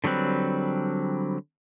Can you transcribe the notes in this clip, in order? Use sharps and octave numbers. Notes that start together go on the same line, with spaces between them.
D3 F#3 G3 C4 B4